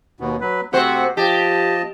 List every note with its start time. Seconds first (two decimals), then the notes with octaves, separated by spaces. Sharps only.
0.20 D#2 B2 B3
0.41 F#3 B4
0.73 C3 A3 C4 F#4 C5 F#5
1.17 F3 G4 D#5 A5